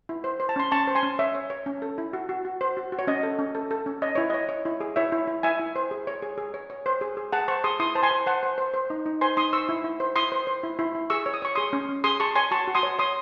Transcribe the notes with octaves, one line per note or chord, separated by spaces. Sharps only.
E4
C5
C5
A5
C#4 C6
C#4 A5 C#6
C5
G#5 C6
C#4
C#5 E5
C#5
C#5
C#4
A4
E4
F#4
F#4
F#4
C5
F#4
F#4
C#5
C#4 D#5
A4
C#4
A4
A4
C#4
C#5 D#5
E4 C#5
C#5 D#5
C#5
E4
G#4
E4 C#5 E5
E4
E4
E4 E5 G#5
E4
C5
G#4
C#5
G#4
G#4
C#5
C#5
C5
G#4
G#4
G#4 F#5 A5
C5 A5 C#6
G#4 C6 D#6
E4 C6 D#6
C5 A5
G#5 C6
C5
C5 F#5 A5
C5
C5
C5
D#4
D#4
C5 G#5 C6
D#4 C6 D#6
C5 C#6 E6
E4
E4
C5
E4 C6 D#6
C5
C5
E4
E4
E4
G#4 C#6 E6
C#5
D#6
C#5 C#6
G#4 C6 D#6
C#4
C#4
G#4 C6 D#6
G#4 A5 C#6
C#5 G#5 C6
F#4 A5 C#6
F#4
C6 D#6
C#5
C#5 C6 D#6